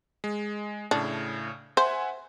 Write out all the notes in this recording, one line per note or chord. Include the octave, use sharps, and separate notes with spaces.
G#3
A2 C#3 D4
C5 E5 F#5 G#5